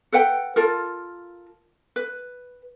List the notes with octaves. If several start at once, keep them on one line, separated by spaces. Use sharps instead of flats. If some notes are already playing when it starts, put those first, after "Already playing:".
A4 B4 F#5 G5
F4 A4 A#4
B4